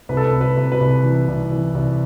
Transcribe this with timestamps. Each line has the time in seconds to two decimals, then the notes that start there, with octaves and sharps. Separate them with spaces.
0.09 C2 B4
0.17 A4
0.25 B4
0.33 C2
0.41 B4
0.57 C3
0.72 B4
0.81 C2
1.03 E3
1.28 C2
1.52 E3
1.74 C2